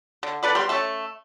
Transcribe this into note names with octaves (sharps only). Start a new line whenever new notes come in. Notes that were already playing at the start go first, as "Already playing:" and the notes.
D3
D4 A4 B4 D5
G3 B3 G4 C6
A3 C#4 A4 E5